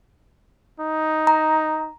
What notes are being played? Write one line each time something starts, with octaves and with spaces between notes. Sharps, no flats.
D#4
A#5